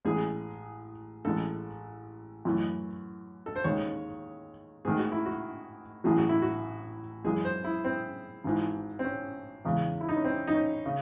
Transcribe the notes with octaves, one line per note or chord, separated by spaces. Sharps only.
A1 A2 G#3 G#4
A1 A2 G#3 A4
F#2 E3 A3
A4
C5
D#2 D#3 G#3 C#5
G#2 D#3 A3 G#4
F#4
E4
F#4
A1 A2 F#3 G#4
F#4
E4
F#4
F#2 E3 G#3 G#4
C5
E4
C4
G#1 G#2 E3
C4
C#4
E2 C#3 G#3
E4
D#4
C#4
C4
D#4
C#4
C#3